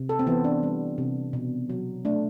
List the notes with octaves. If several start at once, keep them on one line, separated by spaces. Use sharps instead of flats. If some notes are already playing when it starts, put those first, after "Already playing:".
Already playing: C3
A4
C4
E3 B3
D4
G3
C3
B2
F#3
A3 D4